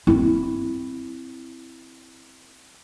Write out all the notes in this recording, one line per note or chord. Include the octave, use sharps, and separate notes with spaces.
C4 E4